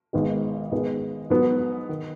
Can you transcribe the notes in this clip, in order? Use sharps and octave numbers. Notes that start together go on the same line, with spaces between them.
G#1 G#2 D#3 G#3 B3
G#2 D#3 G#3 B3
G#2 F#3 B3
D#3